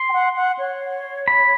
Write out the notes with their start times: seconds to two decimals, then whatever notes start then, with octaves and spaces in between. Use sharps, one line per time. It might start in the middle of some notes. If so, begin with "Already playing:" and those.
Already playing: C6
0.09 G5
0.13 F#5
0.36 F#5
0.59 C#5
1.28 B5